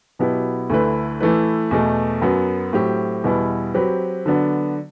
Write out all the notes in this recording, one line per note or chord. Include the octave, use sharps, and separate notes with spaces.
B2 F#3 B3 E4 G4
D2 D3 A3 E4 B4
E3 A3 E4 B4
E2 B2 A3
F#2 F#3 B3
A2 F#3 C4 G4
E2 B2 G3 B3 E4
F#3 C4 G4 B4
D3 F#3 B3 D4